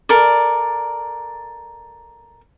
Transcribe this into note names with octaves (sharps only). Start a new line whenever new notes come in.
A4 A#4 D5